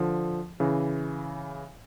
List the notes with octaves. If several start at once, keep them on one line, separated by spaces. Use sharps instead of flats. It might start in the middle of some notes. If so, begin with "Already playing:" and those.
Already playing: D3 F3
C#3 E3